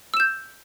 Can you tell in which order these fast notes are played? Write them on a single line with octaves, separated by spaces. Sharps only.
E6 E7 G6